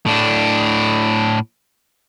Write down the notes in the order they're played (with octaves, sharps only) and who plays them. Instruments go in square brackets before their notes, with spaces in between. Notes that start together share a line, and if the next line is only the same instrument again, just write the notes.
[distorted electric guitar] A2 D4